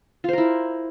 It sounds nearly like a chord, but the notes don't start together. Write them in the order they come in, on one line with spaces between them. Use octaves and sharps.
F4 C5 A#4 E4